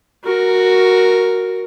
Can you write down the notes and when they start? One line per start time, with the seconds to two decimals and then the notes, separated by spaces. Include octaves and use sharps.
0.24 F#4 A#4